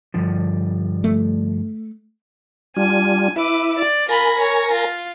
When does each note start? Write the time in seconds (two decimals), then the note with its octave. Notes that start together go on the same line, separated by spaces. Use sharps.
0.14 G2 D3 F3
1.04 A3
2.77 G3 D4 F4 G#5
3.36 E4 B4 E5 D6
3.78 D5
4.09 F4 A#4 G#5 B5 A#6
4.38 C#5
4.72 F4